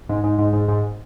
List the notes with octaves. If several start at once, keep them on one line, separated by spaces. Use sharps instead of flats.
G#2
G#2
G#2
G#2
G#2